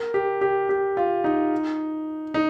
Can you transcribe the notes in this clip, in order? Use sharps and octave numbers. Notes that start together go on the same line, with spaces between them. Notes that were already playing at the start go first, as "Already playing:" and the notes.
Already playing: A#4
G4
G4
G4
F4
D#4
D#4